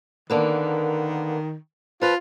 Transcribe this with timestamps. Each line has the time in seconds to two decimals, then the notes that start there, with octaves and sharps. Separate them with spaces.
0.30 D3 D#3 A#3 B3
2.02 F3 F4 B4